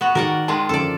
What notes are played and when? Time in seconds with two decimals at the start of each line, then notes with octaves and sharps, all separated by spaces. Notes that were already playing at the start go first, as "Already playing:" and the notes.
0.01 B3 F#4
0.15 D#3 F#4 G#4 A#4 D5 F#5
0.48 D#3 G#3 F4 A5
0.69 F#2 D3 F3 A4 D5